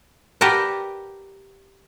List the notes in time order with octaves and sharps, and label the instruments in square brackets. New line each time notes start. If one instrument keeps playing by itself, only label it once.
[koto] G4 A#4 B4 D5 F#5 A5